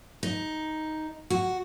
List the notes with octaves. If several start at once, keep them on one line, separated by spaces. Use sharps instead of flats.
D#4
F#4